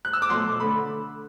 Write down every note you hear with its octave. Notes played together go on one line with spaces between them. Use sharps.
F#6
E6
D6
B2 F#3 A3 C6
D3 A3 B5